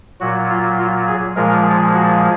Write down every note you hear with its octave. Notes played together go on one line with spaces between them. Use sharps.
A#2 F#3 F#4
F4
F4
G#4
A#2 F3 G#3 A#4
F#4